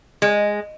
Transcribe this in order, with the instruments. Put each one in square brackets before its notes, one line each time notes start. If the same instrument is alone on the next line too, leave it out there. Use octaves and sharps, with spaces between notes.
[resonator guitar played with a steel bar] G#3